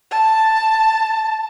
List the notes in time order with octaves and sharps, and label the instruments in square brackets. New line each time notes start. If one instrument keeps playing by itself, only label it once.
[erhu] A5